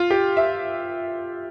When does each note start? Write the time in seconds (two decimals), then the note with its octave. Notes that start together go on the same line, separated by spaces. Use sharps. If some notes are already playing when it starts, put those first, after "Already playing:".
Already playing: F4
0.10 G4
0.37 E5